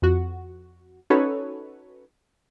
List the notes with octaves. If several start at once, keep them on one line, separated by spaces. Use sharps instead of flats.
F2 F#4
C#4 D#4 F#4 A4 B4 C#5